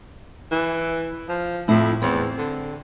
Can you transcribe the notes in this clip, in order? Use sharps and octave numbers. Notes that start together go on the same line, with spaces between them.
E3
F3
F2 A2 E4
E2 C4
D3